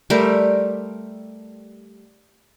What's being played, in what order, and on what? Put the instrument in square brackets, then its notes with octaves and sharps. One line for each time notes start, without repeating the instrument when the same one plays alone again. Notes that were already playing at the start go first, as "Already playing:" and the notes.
[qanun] G3 A3 A#4 C5